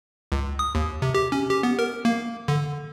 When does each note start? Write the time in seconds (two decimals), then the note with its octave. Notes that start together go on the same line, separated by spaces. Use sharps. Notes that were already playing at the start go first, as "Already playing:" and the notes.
0.32 C#2
0.59 D#6
0.75 D#2
1.02 C3
1.14 G4
1.32 C#4
1.50 G4
1.63 B3
1.79 A#4
2.05 A#3
2.48 D3